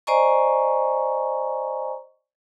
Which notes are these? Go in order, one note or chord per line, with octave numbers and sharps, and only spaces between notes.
C5 D5 D#5 G#5 A#5 C#6